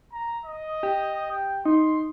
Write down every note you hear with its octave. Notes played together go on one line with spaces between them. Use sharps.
A#5
D#5
G4
G5
D#4 C6